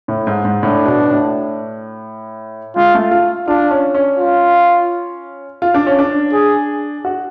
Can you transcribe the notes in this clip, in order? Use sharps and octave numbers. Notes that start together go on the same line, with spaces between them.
A2
G#2
G#2
A2 D4
B2
A2
G#3 F4
A3
F4
D4 F4
C#4
C#4
F4
F4
D4
C#4
D4
G#4
F#4